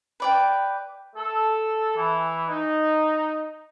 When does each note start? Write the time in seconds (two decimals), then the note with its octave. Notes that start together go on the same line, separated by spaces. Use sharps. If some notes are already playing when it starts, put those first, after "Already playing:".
0.20 B4 D5 G5
1.16 A4
1.96 E3
2.48 D#4